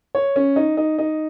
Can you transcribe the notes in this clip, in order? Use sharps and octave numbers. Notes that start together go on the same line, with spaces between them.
C#5
C#4
D#4
D#4
D#4